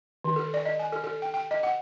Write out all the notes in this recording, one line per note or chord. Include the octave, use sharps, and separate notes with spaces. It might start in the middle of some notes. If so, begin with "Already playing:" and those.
D#3
A4
D5
D#5
G#5
A4
A4
G5
G5
D#5
F#5